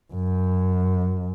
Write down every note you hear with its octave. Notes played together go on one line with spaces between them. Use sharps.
F#2